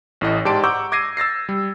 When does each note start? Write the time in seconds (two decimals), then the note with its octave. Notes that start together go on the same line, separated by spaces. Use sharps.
0.21 A1 A2 D#5
0.45 G#2 G4 D5 A5 C6 D7
0.64 F#5 A#5 C#6 D6 E6 G6
0.92 D6 G#6 A#6 C7 D#7
1.17 E6 A6 A#6 C7
1.49 G3